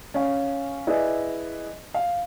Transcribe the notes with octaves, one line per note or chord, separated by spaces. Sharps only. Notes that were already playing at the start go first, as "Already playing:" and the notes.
C#4 F5
E4 G#4 B4 D5 D#5
F5